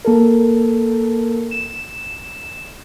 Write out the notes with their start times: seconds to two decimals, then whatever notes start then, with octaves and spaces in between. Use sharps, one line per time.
0.05 A#3 A4 A#4
1.51 E7